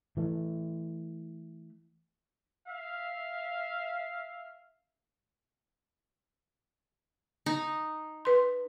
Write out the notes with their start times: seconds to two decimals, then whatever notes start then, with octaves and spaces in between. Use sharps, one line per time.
0.17 E3 A3
2.68 E5 F5
7.46 D#4
8.25 B4 C6